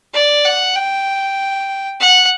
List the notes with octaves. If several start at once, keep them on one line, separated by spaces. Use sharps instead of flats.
D5
F#5
G5
F#5